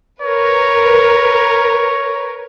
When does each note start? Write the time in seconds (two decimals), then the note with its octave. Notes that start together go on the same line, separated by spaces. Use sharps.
0.22 A#4 B4 C#5